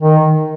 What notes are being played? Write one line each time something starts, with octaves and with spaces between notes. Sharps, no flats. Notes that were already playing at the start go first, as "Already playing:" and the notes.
D#3